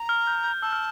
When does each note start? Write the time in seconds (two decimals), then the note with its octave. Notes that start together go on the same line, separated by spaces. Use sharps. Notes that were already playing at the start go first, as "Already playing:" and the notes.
Already playing: A#5
0.09 F6
0.27 G6
0.44 G6
0.62 A5 E6
0.73 F6